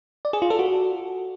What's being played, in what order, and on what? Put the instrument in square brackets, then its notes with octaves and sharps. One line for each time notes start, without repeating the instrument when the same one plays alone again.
[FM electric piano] D5
G#4
F4
A4
F#4